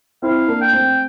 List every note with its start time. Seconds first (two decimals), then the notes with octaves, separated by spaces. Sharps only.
0.22 C4 E4 F5
0.48 A#3 D4
0.61 G5
0.73 A3 C4